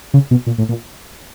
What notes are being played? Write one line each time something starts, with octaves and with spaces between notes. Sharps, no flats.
C#3
B2
A#2
A2
A#2